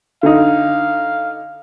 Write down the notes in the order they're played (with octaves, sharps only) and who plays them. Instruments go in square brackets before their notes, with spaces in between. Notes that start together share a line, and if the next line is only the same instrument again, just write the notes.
[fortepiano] D3 D#4 [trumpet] F5